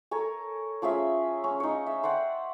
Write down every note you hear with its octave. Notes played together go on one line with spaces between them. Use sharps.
A4 A#4 C#5 G#5
F3 C#4 G#4 E5
C#4
D#4 C#5
E5
C5 D5 F#5 G5